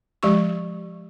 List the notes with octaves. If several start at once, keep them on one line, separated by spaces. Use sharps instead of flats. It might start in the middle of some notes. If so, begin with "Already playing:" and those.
F3 G#3 G4 C#6